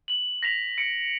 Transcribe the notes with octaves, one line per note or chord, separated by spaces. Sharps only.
F#7
A#6 B6 F7
C#7 D7